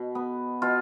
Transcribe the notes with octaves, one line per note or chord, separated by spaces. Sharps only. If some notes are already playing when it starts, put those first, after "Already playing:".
Already playing: B2
B3
B2 F4